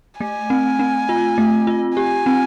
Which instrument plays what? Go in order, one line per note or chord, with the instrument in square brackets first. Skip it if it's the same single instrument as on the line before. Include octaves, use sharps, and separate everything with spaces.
[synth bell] A3 [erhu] G#5
[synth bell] C4
C4
F4
A3
F4
[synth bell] G4 [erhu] G#5
[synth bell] C4